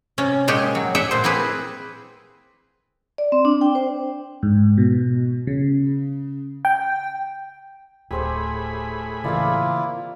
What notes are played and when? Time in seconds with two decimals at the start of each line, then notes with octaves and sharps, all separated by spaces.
0.18 C3 C#4
0.48 A#2 G#3 G4 C#5
0.75 F#3
0.95 G4 G#4 E5 F#5 G5
1.11 A#2 C5
1.24 C4 E4 G4 G#4 B4
3.18 D5
3.32 C4
3.45 D4
3.61 G5
3.75 C5
4.43 G#2
4.78 B2
5.47 C#3
6.65 G5
8.11 D1 A2 G4 G#4 C5 B5 E6
9.24 C#3 E3 A#3 C4 E4 F4 D5 F5